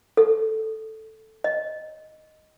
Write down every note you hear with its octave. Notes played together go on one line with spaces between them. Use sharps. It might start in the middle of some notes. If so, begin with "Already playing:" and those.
A4
D#5